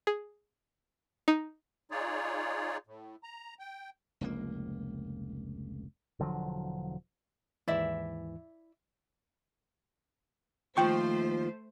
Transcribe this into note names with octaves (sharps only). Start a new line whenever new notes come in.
G#4
D#4
D#4 F4 G#4 C#5 D5
A2
A#5
G5
F1 C#2 A#3
E1 D3 F3 F#3
D#2 G#2 E3 E4 D5 E5
D#2 F3 A3 F4 C5 G5 C#6